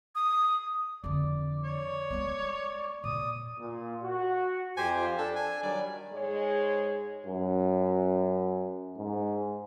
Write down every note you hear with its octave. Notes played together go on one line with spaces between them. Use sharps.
D#6
F2 D3 D5
C#5
G#3 B3
A#2 D5 D#6
A#2
F#4
F2 G4 C5 G#5
F4
D4 A4
G#5
D#3 F#3 G3 D5
G#2 G#3 G#4 C#5
F#2
G#2